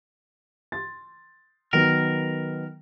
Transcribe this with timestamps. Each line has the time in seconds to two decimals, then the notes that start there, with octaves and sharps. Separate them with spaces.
0.72 C6 A6
1.73 D#3 F#3 B3 A#4